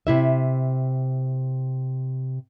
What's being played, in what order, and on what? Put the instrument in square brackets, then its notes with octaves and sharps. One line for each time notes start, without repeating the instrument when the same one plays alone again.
[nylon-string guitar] C3 E4 E5